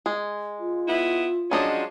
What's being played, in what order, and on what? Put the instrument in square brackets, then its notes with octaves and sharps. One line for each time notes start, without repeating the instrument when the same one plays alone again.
[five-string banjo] G#3
[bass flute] F4
[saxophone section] B3 E4
[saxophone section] F3 G#3 C#4 [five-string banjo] F#3 D4 D#5